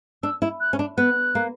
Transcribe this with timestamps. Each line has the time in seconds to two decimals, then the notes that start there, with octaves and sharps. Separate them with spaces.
0.23 D4 E6
0.42 E4
0.60 F#6
0.73 C#4
0.79 D4
0.97 B3 F#6
1.35 A#3